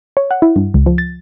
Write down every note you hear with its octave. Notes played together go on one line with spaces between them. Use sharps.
C#5
F#5
E4
G2
C#2
F3
A6